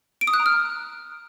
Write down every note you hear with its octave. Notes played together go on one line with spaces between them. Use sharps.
D7
D#6
F#6
A#5
F6